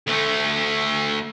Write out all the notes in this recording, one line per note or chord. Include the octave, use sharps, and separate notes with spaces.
D2 A3